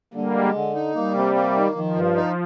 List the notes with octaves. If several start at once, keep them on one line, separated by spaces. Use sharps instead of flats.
D3 G3 A#3
G#3
D3
D#4
G3 A#3
C3
A#3
D#3
D#3 F3
G2
D#4